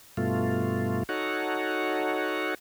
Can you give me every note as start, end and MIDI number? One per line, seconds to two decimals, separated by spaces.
0.17 1.03 43
0.17 1.03 47
0.17 1.03 57
0.17 1.03 65
1.09 2.54 63
1.09 2.54 66
1.09 2.54 69
1.09 2.54 73
1.09 2.54 78